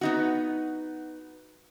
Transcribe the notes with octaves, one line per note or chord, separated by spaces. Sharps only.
B3 D#4 F#4